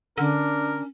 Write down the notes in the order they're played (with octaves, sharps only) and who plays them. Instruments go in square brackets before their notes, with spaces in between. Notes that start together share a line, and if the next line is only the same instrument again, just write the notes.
[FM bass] D3 [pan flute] C#4 [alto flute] D4 [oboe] A#4